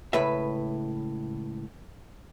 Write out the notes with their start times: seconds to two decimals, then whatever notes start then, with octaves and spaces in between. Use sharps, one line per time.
0.13 C#2 A2 B4 E5